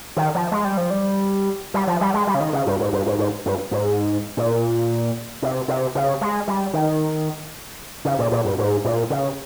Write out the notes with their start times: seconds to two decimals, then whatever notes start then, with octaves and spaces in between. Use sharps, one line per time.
0.17 D#3
0.35 F3
0.52 G#3
0.65 G3
0.77 F3
0.90 G3
1.74 G3
1.87 F3
2.01 G3
2.14 G#3
2.27 G3
2.35 C#3
2.40 D#3
2.53 C#3
2.67 G2
2.80 G#2
2.93 G2
3.06 G#2
3.19 G#2
3.46 G2
3.71 G#2
4.37 A#2
5.42 C3
5.68 C3
5.95 C#3
6.21 G#3
6.48 G3
6.74 D#3
8.05 C#3
8.19 A#2
8.32 A#2
8.45 G2
8.58 G#2
8.85 A#2
9.10 C#3